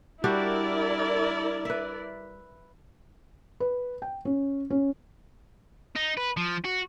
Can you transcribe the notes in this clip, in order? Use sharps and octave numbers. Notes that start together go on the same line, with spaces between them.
G3 D4 E4 F#4 A#4 D5
B4 E5
B4
G5
C#4
C#4
D#4
B4
F3
F#4